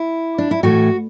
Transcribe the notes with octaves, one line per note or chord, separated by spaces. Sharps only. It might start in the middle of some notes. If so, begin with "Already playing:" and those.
Already playing: E4
D4
E4
A2 E3 A3 F#4